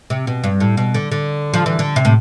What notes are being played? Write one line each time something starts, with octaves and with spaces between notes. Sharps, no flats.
C3
B2
G2
A2
B2
D3
D3
F3
E3
D3
C3
A2